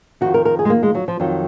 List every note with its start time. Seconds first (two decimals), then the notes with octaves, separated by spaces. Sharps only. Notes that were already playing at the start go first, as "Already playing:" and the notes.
0.21 F2 D#3 F#4
0.34 A#4
0.45 A#4
0.59 G#4
0.65 G#3
0.70 A#3
0.83 G#3
0.95 F#3
1.08 F3
1.20 F2 D#3 F#3